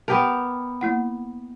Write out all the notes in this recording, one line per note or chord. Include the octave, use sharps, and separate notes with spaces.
B3 G4 A#4 A5
A#3 E4 F#5